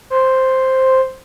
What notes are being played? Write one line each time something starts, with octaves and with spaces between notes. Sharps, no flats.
C5